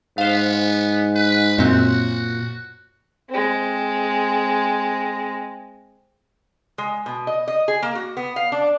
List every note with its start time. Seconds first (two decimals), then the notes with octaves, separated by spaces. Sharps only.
0.18 G#2 B3 C5 F5
1.15 B4
1.58 F#2 A#2 C4 F#4
3.29 G#3 C4
6.78 G#3
7.06 B2
7.27 D#5
7.48 D#5
7.68 G#4
7.82 A#3
7.95 F#4
8.17 B3
8.36 F5
8.52 D4